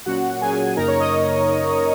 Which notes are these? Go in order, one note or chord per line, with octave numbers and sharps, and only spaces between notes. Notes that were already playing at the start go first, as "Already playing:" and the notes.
A#2 F#3 C#4 F#4 F#5
A#2 F#3 C#4 G#4 G#5
F#2 C#3 A#3 D#4 A#4 A#5
C#5 C#6
D#5 D#6